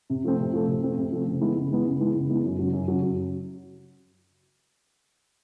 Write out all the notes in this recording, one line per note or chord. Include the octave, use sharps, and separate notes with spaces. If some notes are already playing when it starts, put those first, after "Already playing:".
C3
F3 A3 C4
C3
F3 A3 C4
C3
F3 A3 C4
C3
F3 A3 C4
C#3
E3 G#3 B3 E4
C#3
E3 G#3 B3 E4
C#3
E3 G#3 B3 E4
C#3
E3 G#3 B3 E4
F#2
C#3 F#3
F#2
C#3 F#3
F#2